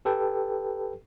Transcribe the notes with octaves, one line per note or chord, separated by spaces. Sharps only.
G4 A4 B4 G5